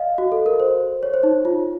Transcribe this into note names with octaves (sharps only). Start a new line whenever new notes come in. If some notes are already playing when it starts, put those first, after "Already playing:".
Already playing: D#5 F5
F#4
A4
A#4
C5
C#5
C5
D#4
F4